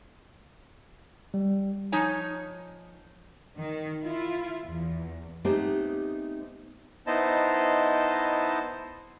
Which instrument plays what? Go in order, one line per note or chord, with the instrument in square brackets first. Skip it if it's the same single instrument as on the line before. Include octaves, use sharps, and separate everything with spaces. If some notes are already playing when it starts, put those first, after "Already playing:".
[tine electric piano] G3
[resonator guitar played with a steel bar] F3 D#4 C#5 G#5
[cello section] D#3
E4 F4
E2
[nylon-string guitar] G#3 A3 B3 C4 D#4 G4
[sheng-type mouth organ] B3 D#4 E4 C5 D#5 A5